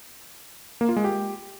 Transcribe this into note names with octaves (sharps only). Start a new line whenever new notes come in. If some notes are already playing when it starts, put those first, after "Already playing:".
A#3
F4
G#3
G4